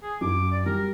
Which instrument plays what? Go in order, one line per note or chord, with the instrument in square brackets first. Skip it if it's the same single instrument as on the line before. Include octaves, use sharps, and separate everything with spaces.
[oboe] G#4
[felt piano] F#2 [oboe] D6
[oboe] D5
[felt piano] G3 [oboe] A#4